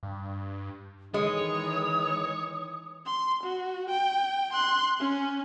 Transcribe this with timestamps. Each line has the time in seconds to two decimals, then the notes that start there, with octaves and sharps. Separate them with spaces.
0.03 G2
1.14 D#3 E3 G#3 C#5 D#6
3.06 C6
3.43 F#4
3.90 G5
4.53 C6 F#6
5.00 C#4